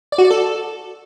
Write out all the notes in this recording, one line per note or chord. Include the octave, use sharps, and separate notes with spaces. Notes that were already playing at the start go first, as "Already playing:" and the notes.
D5
F#4
D5
A4